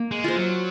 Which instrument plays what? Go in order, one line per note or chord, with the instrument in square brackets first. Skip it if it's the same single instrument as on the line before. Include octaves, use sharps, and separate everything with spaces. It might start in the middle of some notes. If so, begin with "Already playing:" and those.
Already playing: [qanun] A#3
[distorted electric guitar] G#3
[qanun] F4 C5
[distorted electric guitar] F#3